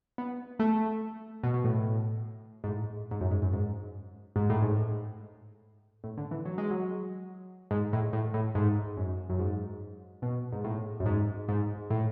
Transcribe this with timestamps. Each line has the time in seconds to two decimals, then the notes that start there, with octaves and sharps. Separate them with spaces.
0.18 B3
0.59 A3
1.44 B2
1.54 B2
1.64 A2
2.64 G#2
2.68 A2
3.11 G#2
3.21 F#2
3.31 G#2
3.42 F#2
3.53 G#2
4.36 G#2
4.50 A2
4.62 G#2
6.04 A2
6.18 D3
6.31 E3
6.46 F#3
6.58 G#3
6.71 F#3
7.71 G#2
7.93 A2
8.13 A2
8.34 A2
8.55 G#2
8.97 F#2
9.30 F#2
9.39 G#2
10.22 B2
10.53 G#2
10.64 A2
11.00 F#2
11.06 G#2
11.49 G#2
11.90 A2